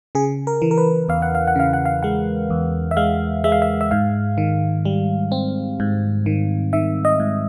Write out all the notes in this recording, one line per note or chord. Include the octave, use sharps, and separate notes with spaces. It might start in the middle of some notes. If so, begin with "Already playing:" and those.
C#3 G#4
A#4
E3
A#4
B4
E2 F5
F#5
F5
F#5
C#3 F5
F#5
F5
G#3 F#5
E2
E5
G#3 F5
G#3 E5
F5
E5
E5
G#2 F5
D#3
G3
C4
G#2
D#3
D#3 E5
D#5
G#2